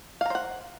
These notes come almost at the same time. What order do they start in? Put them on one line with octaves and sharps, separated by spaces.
F5 A#5 C5 F#5